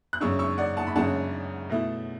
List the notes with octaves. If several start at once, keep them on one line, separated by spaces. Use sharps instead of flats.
F#6
F#2 C#3 G#3 D4 C#6 E6
C#6 E6
D5 F#5
F#5 A5
B5
F#2 C#3 G#3 D4 F#5 A5
B2 A3 E4